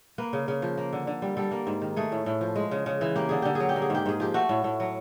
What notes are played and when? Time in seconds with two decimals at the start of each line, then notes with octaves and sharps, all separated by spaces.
0.18 A#3 B4
0.33 C#3
0.48 C#3
0.62 F3
0.77 A#3
0.93 D3
1.07 D3
1.22 G3
1.37 G3 A4
1.51 A#3
1.67 G#2
1.81 D#3
1.96 A3 G#4
2.12 A2
2.26 A2
2.41 F3
2.56 G#3
2.71 C#3
2.86 C#3
3.01 E3
3.16 A#3 G4
3.29 D3 G#4
3.42 D3 G4
3.55 F#3 G#4
3.69 G4
3.76 A#3
3.82 G#4
3.90 G#2 G4
4.06 G#2 G#4
4.20 F3 G4
4.34 A3 F#4
4.49 A2
4.64 A2
4.80 F#3